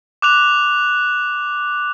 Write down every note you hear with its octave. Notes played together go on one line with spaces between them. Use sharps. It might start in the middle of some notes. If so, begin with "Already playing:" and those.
D6 F#6 F7